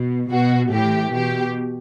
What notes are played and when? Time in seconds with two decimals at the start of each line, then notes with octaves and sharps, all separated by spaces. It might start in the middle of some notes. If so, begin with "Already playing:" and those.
Already playing: B2
0.30 B2 F#4
0.71 A2 E3 G4
1.13 B2 G4